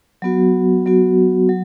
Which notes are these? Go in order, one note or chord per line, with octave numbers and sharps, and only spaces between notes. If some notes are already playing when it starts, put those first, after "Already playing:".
F#3 B3 F#4
F#3 B3 F#4
F#3